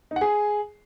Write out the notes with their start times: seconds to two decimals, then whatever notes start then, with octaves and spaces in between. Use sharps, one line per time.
0.11 D#4
0.16 F#5
0.21 G#4